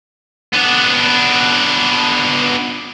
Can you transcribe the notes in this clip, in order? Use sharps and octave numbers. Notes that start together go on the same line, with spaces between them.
B3 D4